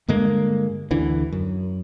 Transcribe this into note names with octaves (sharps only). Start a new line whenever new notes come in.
G2 D3 G#3 A#3
D2 D3 E3
F#2